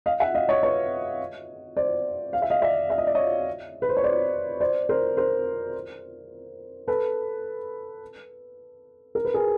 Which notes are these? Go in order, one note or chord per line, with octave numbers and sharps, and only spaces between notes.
D#5 F5
E5 F#5
D#5 F5
C#5 D#5
B4 C#5
C5 D5
F5
E5
D#5 F5
D5 E5
E5
D#5
D5
C#5 D#5
B4
C5
C#5
C5 D5
C5 D5
A#4 C5
A#4 C5
A4 B4
A#4
B4
G#4 A#4